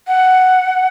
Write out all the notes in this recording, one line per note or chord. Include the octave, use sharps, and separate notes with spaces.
F#5